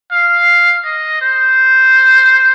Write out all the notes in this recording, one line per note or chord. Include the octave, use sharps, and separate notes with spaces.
F5
D#5
C5